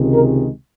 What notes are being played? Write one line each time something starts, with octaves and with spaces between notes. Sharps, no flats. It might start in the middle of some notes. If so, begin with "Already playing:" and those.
Already playing: C#2 C3 D#3 G#3
A#4